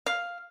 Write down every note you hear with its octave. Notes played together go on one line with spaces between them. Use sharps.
F5